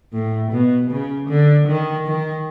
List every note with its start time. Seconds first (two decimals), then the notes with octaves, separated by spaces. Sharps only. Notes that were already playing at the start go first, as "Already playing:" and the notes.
0.13 A2
0.52 B2
0.90 C#3
1.29 D3
1.67 D#3
2.06 D#3